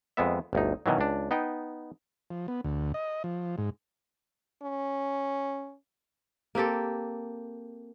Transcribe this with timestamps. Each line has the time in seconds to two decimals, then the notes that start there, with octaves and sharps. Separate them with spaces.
0.17 F2 G#3 B3 E5
0.53 G1 D2 D#4
0.86 B2 D#3 E3 F#3
0.98 C#2 D4
1.31 B3 D#4 G5
2.30 F3
2.48 B3
2.64 D2
2.94 D#5
3.24 F3
3.58 G#2
4.62 C#4
6.55 A#3 C4 G4 A4